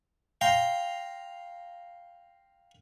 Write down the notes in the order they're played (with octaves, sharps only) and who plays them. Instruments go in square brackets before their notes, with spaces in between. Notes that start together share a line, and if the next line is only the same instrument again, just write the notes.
[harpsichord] F5 G5 A#5 C6